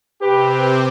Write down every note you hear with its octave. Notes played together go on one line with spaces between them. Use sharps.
C3 C4 G4 B4